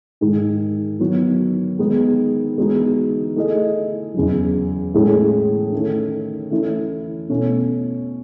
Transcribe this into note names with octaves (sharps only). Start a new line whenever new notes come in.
G#2 D#3 G#3 D#4 G#4
D#3 F#3 B3 F#4
D#3 G#3 B3 D#4
E3 G#3 B3 D#4 F#4
A3 E4 G#4 D#5
E2 C#3 F#3
A2 E3 G#3 C#4 E4
D#3 A3 C#4
E3 A3 C#4 E4
B2 A3 C#4